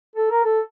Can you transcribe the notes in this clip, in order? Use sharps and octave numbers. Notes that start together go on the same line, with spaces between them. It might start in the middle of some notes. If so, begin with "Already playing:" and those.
A4
A#4
A4